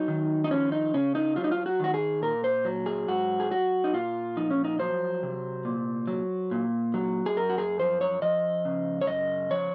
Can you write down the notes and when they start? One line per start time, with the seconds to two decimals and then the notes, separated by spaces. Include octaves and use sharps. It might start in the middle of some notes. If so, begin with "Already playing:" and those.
Already playing: F#3 D#4
0.08 D#3
0.44 D#4
0.51 F3 C#4
0.72 D#4
0.94 C#3 C#4
1.15 D#4
1.36 F#3 F4
1.44 D#4
1.51 F4
1.66 F#4
1.80 D#3 F#4
1.94 G#4
2.22 A#2 A#4
2.44 C5
2.65 F#3
2.86 G#4
3.08 G#2 F#4
3.40 G#4
3.51 F#3 F#4
3.84 D#4
3.93 A#2 F4
4.37 F3 D#4
4.51 C#4
4.64 D#4
4.79 F#3 C5
5.23 C3
5.65 A#2
6.07 F#3
6.51 A#2
6.94 F#3
7.26 G#4
7.37 F#2 A#4
7.50 F#4
7.58 G#4
7.79 F3 C5
8.01 C#5
8.22 F3 D#5
8.65 C#3
9.01 C#5
9.07 F#2 D#5
9.51 F3 C#5